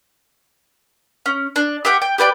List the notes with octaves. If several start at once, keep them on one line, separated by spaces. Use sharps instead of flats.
C#4
D4
G4 E5 F#5 G5
G5
G4 B4 D5 G5